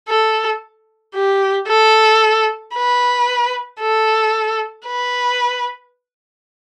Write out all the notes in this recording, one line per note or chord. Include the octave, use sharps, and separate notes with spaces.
A4
G4
A4
B4
A4
B4